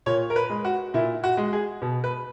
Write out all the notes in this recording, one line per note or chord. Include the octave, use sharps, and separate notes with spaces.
A#2 C#5
A#4
B4
G#3
F#4
A#2 E4
F#4
G#3
G#4
B2
B4